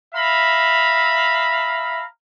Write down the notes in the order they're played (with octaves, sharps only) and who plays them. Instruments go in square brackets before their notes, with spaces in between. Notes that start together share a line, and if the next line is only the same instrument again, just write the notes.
[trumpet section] E5 F5 A#5 B5